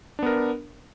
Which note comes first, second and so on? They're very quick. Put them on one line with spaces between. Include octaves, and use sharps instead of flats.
D4 B3 A#4